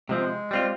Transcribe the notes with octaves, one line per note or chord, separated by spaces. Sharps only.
C3 F3 G#3 C4
G3 C4 F4